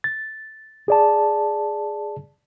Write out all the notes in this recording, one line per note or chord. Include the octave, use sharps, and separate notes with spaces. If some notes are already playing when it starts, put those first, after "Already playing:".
A6
G#4 D5 A5